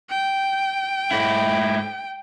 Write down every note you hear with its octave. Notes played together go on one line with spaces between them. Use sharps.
G5
G#2 E4